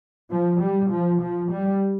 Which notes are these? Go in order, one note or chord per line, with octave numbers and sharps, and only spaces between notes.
F3
G3
F3
F3
G3